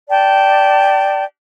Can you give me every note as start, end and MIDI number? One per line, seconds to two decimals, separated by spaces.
0.10 1.24 74
0.10 1.24 79
0.10 1.24 81